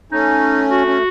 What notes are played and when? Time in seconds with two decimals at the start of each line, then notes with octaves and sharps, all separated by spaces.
0.12 A3 C#4 D#4
0.69 F#4
0.87 C#4